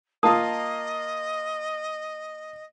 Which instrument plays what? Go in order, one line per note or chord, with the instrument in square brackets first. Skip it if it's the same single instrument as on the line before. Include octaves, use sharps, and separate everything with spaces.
[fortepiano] A#3 F4 [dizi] D#5 [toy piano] A5 D#6